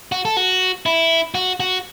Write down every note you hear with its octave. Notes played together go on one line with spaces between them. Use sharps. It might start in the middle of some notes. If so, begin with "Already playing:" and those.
F#4
A4
F#4
E4
F#4
F#4